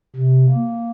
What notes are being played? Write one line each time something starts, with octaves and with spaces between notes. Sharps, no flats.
C3
A#3